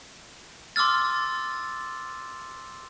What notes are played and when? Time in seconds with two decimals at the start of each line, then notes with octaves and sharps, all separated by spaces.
0.76 C6 D6 E6 F6 A6